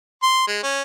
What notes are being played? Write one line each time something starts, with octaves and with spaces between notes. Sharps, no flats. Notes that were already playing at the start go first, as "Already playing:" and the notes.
C6
G#3
C#4